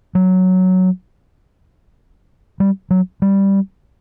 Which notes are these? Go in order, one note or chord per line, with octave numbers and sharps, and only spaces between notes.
F#3
G3
F#3
G3